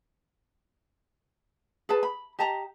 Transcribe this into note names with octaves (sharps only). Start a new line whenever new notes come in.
G#4 B4 A5
B5
G4 D#5 A5 A#5